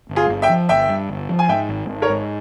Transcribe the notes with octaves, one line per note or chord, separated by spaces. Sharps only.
G1
F4 G#4
G1
E5 G5
F3
G1 E5 G5
G2
G1
F3
G#5
G#2 E5 G5
G#1
G#1
A#4 C#5
G#2